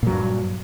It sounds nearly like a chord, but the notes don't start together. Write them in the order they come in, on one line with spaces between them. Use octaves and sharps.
A#2 F#3 G2